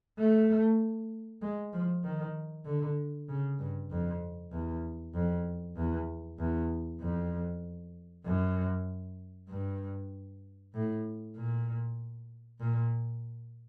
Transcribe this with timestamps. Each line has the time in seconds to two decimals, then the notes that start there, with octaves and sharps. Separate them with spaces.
0.18 A3
1.42 G#3
1.73 F3
2.04 D#3
2.65 D3
3.29 C#3
3.59 G2
3.91 F2
4.52 E2
5.14 F2
5.76 E2
6.39 E2
7.00 F2
8.25 F#2
9.49 G2
10.74 A2
11.36 A#2
12.60 A#2